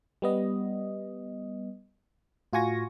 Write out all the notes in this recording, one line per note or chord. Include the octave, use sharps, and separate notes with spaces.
G3 B3 D#5
A2 F4 F#4 G#5 C#6 A#6